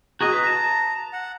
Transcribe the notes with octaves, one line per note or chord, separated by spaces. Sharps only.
F#4 G#4 D#5 A#5
B4
A5
F#5